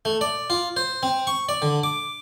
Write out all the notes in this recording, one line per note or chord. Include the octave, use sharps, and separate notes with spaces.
A3
D5
F4
C5
C4
C#6
D5
D3
D6